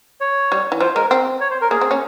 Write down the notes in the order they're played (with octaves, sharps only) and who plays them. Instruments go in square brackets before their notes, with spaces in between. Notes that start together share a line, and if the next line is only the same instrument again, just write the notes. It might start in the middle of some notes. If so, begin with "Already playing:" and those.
[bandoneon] C#5
[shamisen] G3
E3
[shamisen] F3 [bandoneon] C5
[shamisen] G#3 [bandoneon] A#4
[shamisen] C4
[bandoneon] C#5
C5
A#4
[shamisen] A#3 [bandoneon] G#4
[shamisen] C4
A#3 C#4